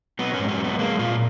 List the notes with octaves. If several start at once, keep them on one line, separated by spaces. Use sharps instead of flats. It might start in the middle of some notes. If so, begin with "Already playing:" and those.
F#3 B3
G#2 C#4
C#4
F#3
B3
G#3 A#3
A#2 F4